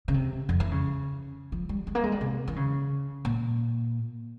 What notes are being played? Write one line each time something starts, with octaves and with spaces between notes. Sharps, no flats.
C#3
C3
F2
E3
C#3
F3
G3
G#3
A#3
G#3
G3
C3
E3
C#3
A#2